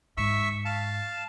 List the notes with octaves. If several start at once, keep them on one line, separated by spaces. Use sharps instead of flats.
G#2 E5 C#6 E6
F5 A5